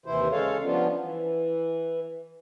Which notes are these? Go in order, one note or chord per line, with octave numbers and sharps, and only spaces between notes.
D#2 C3 E3 E4 C5
C#3 G#3 A4 C#5 F5
F3 G3 B3 C#4 D4 F4
E3